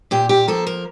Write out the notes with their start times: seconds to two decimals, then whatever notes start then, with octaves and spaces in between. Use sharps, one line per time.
0.11 A#2 G4
0.29 G4
0.48 F3 A#3 A4
0.67 A#4